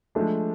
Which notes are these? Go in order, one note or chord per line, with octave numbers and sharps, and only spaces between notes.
F3 G#3 A3 D4